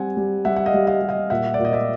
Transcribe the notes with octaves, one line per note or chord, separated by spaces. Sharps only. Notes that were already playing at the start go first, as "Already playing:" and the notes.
Already playing: G3 C4 F#5 G#5
G3
G3 E5 F#5
F#5
D#5 F5
G3
D#5 F5
G3
D#5 F5
A#2 E5 F#5
D5
A#2
D#5
D5 E5